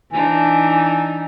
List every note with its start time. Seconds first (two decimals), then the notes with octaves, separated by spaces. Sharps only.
0.12 E3 D4 D#4 G#5